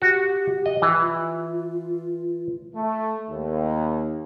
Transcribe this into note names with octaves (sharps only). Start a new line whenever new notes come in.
F#4 G4
D#5
E3
F4
A3
D#2